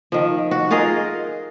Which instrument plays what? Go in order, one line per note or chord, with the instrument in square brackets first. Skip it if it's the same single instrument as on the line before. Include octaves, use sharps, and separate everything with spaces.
[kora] D#3 F3
F#4
F4 G#4 A#4 D#5